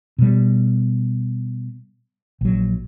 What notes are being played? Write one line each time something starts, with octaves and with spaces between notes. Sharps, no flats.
B2 G3
A#1 F#3